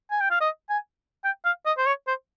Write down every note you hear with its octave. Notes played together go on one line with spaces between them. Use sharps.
G#5
G5
F5
D#5
G#5
G5
F5
D#5
C5
C#5
C5